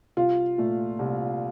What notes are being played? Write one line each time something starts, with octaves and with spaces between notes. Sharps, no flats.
C2 F4
A#2 A3
C2